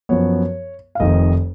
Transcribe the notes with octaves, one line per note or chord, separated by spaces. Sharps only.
F#2 F3 B3 C#5
F5
F1 F2 D#3 D#5